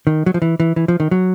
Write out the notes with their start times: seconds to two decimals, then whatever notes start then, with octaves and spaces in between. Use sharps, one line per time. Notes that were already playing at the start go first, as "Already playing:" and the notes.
0.07 D#3
0.26 F#3
0.34 F3
0.42 E3
0.60 E3
0.76 E3
0.88 F3
1.00 D#3
1.11 F#3